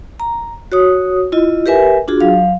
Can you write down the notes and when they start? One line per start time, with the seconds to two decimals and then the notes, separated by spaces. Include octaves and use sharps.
0.20 A#5
0.72 F#4 C#5 D#6
1.32 E4 F4 D#5
1.66 G4 A#4 B4 E5 G#5
2.08 D4 F4 F#4 G#4
2.21 F#3 F5